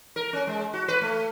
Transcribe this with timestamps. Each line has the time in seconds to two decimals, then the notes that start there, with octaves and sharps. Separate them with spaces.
0.16 A#4
0.33 C#4
0.47 G#3
0.74 F#4
0.88 B4
1.01 A3